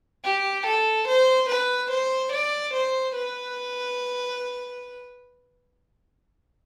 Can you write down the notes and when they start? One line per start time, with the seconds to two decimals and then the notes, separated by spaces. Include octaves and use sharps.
0.24 G4
0.66 A4
1.07 C5
1.48 B4
1.90 C5
2.32 D5
2.73 C5
3.15 B4